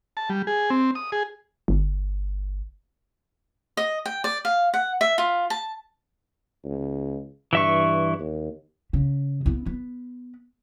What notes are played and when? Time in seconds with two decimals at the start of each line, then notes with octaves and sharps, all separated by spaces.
0.17 A5
0.30 G3
0.47 G#4
0.70 C4
0.95 D#6
1.12 G#4
1.68 G1
3.77 D#5
4.06 G5
4.24 D5
4.45 F5
4.74 F#5
5.01 E5
5.18 F4
5.50 A5
6.65 C#2
7.53 G2 E3 E5 C#6
8.19 D#2
8.93 C#3
9.46 B3 E4
9.66 B3